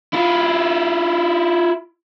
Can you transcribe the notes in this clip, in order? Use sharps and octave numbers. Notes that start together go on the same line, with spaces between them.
E4 F4